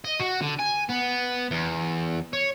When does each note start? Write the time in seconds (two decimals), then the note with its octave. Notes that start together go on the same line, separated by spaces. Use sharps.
0.05 D#5
0.20 F#4
0.42 D3
0.60 G#5
0.90 B3
1.51 E2
2.33 C#5